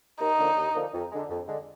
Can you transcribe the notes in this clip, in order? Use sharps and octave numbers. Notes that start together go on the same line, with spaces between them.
D#2 D#4
D3 F3 A#3
D#2
D3 F3 A#3
F2
D3 G#3
F2
D3 G#3